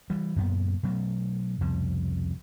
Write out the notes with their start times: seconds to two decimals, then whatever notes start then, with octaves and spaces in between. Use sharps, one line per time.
0.10 E3 G3
0.36 F#2 A#2 B3
0.83 B2 F#3 A3
1.61 C2 F2 B2 F3